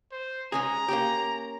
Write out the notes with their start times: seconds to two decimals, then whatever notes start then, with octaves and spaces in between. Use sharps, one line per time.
0.12 C5
0.52 G#3 C#4 G#4 A#5
0.88 A#3 C#4 G4